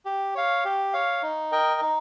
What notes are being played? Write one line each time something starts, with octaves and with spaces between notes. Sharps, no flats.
G4
C#5 F5
G4
C#5 F5
D#4
A#4 D#5 G5
D#4